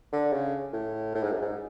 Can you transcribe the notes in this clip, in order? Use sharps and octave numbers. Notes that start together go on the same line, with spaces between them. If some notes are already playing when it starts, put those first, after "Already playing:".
D3
C#3
A2
A2
G#2
F#2
G#2